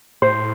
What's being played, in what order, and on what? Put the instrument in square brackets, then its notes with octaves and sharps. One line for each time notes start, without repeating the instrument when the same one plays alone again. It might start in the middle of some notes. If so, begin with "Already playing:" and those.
[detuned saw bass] A2 [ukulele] C5